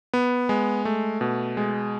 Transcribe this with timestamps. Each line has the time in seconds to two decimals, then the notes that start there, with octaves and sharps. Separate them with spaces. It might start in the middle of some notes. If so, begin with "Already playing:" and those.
0.14 B3
0.49 G#3
0.85 A3
1.21 B2
1.57 G#3